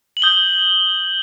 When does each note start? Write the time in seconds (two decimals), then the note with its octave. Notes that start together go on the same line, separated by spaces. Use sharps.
0.17 F#7
0.22 D#6 G6 G7